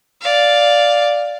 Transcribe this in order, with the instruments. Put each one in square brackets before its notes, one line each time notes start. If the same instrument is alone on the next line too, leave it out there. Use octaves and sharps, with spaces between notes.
[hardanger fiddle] D5 F5